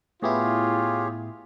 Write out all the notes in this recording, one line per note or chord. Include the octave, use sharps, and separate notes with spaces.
A2 B3 E4 F4 G4 G#4 C#5